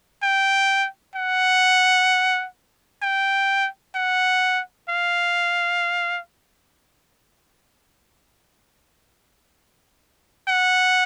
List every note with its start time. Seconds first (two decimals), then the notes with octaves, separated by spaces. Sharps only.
0.22 G5
1.15 F#5
3.02 G5
3.95 F#5
4.89 F5
10.48 F#5